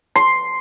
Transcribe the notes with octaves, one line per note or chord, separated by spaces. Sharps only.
C6